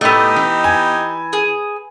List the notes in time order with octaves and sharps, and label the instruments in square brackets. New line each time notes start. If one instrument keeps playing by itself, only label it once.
[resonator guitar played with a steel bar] A2 A3 [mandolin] B3 D#5 [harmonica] D#4 G4
[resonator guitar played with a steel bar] E3
[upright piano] G#5
[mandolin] G#4